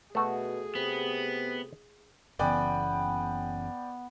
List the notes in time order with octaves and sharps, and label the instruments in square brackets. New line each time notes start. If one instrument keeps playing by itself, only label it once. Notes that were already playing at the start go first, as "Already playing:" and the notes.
[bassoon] B2 [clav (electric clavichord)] A3 F#4 [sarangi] G#4
[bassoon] C3 [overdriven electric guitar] B3
[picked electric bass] F#1 C#3 E3 [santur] B3 [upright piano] D5 G5 G#5